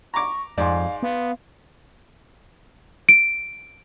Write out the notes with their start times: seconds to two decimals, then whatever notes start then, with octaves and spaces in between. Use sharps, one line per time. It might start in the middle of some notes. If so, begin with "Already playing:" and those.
0.14 A#5 C#6 D6
0.58 F2 G#2 D5 F5 G#5 C6
1.03 B3 F5
3.09 D7